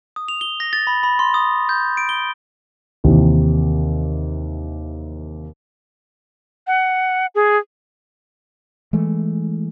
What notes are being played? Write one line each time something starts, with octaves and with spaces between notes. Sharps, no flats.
D#6
F7
G7
A#6
A6
B5
B5
C6
D#6
G6
D7
G7
D#2 C3 D#3 E3
F#5
G#4
E3 G#3 A3